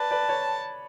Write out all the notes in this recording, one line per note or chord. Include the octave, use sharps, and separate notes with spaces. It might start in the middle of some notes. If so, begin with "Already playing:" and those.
Already playing: B4 D5 A5
B4 D5
C#5